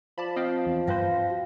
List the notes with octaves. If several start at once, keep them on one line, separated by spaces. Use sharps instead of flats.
F3 D5 A5 B5
C4 D#5 F5 G5
E2
G2 B4 C5 F5 G5 A#6
F#4